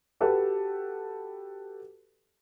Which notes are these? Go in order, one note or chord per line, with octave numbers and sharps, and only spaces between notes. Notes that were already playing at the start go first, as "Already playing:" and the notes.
F#4 G4 A4 B4